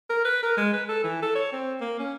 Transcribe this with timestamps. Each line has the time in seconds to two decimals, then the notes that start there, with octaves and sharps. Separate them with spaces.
0.10 A#4
0.25 B4
0.43 A#4
0.57 G#3
0.73 B4
0.88 A4
1.04 E3
1.23 A4
1.35 C#5
1.52 C4
1.81 A#3
1.99 C#4